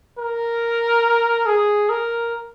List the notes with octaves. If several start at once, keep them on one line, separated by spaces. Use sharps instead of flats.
A#4
G#4
A#4